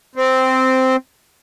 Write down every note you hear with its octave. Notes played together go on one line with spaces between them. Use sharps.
C4